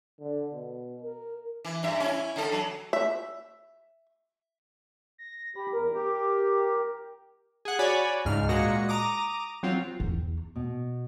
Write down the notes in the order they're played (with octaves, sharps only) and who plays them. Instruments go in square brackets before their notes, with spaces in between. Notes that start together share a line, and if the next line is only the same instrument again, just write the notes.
[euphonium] D3
B2
A#4
[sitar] E3
G2 E5
C#4 E4
D3 A4
F#3
[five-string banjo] E5
[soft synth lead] A#6
[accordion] G4 [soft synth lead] B5
[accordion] E2 [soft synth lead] A#4
[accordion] G4
[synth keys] G#4 F#5
F#4 C#5 D5 G#5 B5
C#2 G#2 F6
A#2 G#3 F#4 A#6 C#7
A#5 D6 D#6
F#3 C4 F4
[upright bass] E2
[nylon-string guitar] B2